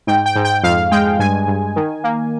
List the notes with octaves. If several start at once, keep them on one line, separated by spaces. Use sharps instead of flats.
G#2 G5
G5
G#2
G5
F2 F5
G#3 G5
G2 G#5
G2
D#3
A#3